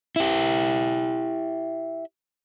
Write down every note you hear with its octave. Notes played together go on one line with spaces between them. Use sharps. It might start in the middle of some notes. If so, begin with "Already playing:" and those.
E4 G4